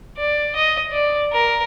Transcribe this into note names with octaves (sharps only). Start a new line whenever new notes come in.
D5
D#5
D5
A#4